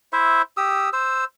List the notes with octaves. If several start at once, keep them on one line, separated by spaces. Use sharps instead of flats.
E4 C5 E5
G4 D#6 E6
C5 E6